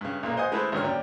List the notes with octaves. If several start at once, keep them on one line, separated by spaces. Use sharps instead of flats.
G2 C#3
B1 A#2 A#3
C5 D#5 F#5 G#5 D#6
G#3 A3 E4 B4 C5 E5
G#1 F#2 D3 F#3 C#4 F6
D#2 C#4 D5 G5